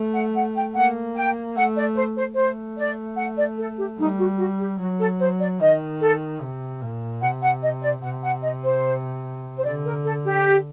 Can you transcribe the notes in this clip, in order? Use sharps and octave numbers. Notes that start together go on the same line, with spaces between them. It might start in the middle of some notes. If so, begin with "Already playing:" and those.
Already playing: A3
F#5
F#5
G5
A#3 F#5
G5
A3 F#5
D5
C5
C5
A3 C5
D5
F#5
D5
A4
G4
G3 D#4
F#4
F#4
G4
F#3 F#4
A4
C5
D5
D#3 D#5
A4
C3
A#2
C3 F#5
F#5
D#5
D5
C3 F#5
F#5
D#5
C5
C5
D3 D5
A#4
A4
G4